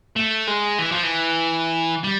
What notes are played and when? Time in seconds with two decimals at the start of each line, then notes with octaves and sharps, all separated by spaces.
0.16 A3
0.47 G#3
0.79 E3
0.91 F3
1.03 E3
2.04 G3